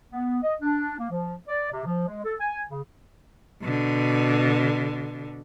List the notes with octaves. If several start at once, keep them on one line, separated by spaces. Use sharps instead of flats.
B3
D#5
D4
A#3
F3
D5
C3
F3
G#3
A4
G#5
C#3
B2 D3